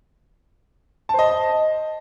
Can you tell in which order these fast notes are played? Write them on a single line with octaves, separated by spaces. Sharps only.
A5 C5 D#5